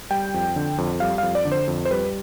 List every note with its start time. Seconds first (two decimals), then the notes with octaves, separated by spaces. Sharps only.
0.11 G3 G5
0.34 F2
0.56 D3
0.78 F2
1.00 G3 F5
1.18 F2 F5
1.35 D5
1.45 D3
1.52 C5
1.68 F2
1.85 C5
1.91 G3 B4